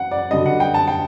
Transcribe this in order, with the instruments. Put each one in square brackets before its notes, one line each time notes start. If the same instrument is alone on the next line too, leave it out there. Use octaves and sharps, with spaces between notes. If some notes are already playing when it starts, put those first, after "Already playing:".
Already playing: [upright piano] F#5
D5
G2 D3 F#3 D#5
F#5
G5
A5
G5